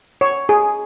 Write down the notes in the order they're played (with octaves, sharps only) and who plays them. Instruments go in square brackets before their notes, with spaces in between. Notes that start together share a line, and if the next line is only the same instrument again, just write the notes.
[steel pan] C#5
G#4